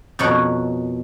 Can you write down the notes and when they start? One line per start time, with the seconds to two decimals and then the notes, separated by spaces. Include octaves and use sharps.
0.19 F2 B2 A#4 C#5 F#5